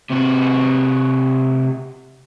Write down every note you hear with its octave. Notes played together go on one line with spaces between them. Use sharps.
C3 F#4